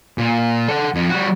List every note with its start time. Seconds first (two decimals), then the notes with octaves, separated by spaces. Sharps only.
0.18 A#2
0.69 A4 F#5
0.95 F2
1.10 G3 F#4